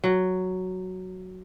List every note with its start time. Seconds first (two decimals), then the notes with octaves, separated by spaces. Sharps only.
0.04 F#3